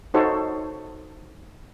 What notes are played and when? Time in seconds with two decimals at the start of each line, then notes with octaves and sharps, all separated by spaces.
0.14 D#4 F#4 A4 C5 C#5